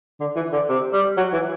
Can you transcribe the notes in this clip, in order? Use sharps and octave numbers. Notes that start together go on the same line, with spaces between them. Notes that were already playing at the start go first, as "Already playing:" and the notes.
D3
E3
D3
C3
G3
F#3
E3